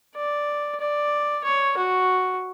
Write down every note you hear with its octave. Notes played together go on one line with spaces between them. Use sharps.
D5
D5
C#5
F#4